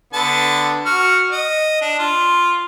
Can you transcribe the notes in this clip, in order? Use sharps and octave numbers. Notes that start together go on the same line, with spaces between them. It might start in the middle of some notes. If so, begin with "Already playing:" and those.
D3 B3 A5
F#4 F6
D#5
D4
F4